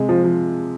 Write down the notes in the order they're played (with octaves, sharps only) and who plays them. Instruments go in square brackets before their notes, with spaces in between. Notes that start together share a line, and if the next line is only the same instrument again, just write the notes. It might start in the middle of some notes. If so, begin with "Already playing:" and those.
Already playing: [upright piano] C3 G#3
[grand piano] F3
[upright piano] F3